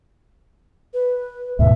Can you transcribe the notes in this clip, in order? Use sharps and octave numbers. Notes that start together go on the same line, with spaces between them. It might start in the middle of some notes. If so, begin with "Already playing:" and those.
B4
D2 G#2 B2 E5